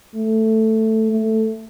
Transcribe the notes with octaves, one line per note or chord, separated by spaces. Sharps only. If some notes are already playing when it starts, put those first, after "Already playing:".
A3
A3